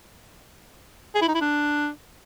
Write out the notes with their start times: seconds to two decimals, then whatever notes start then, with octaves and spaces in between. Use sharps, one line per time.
1.15 G#4
1.22 E4
1.28 D#4
1.35 E4
1.41 D4